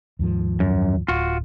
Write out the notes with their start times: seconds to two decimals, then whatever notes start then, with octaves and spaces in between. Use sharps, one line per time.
0.19 D#2 G#2 F3
0.60 F#2
1.08 D1 F4 F#4